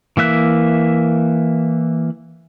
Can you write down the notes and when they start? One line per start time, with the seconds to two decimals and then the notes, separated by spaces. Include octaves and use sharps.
0.17 E3 A#3 E5 F#6